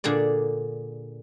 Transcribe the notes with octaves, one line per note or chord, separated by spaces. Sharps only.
A#2 D3 G#4 D5